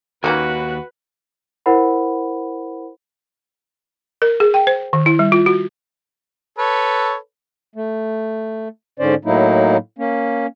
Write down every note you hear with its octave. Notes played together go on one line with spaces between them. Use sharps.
D#2 D#3 A#3 C#4 F#4 B4
E4 A#4 C5 F#5 B5
A#4
G#4
G5
C5
D#3
E4
G3
F4
F#4
A4 B4 C#5
A3
G#2 D3 C#4 C5 D5
A2 F#3 A#3 D#4 E4
A#3 C#4